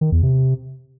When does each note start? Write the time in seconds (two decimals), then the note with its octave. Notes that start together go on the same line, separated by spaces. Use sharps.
0.01 D#3
0.12 E2
0.23 C3